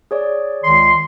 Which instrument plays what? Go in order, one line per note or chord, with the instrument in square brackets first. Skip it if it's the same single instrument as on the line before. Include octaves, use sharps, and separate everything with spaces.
[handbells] G#4 C#5 D5
[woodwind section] C#2 D#3 C6